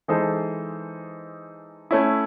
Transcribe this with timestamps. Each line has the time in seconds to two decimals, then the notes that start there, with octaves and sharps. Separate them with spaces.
0.08 E3 G#3 D#4 A4 C5
1.91 A3 C#4 E4